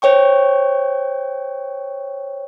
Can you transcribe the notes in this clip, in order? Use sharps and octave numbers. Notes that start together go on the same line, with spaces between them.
C5 C#5 G5 C#6